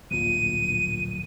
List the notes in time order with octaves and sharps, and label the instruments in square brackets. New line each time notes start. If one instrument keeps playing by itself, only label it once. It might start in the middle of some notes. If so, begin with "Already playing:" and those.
[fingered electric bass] D1 [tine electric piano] A#1 A#2 [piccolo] D#7